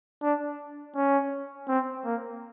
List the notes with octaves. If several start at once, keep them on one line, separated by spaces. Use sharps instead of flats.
D4
C#4
C4
A#3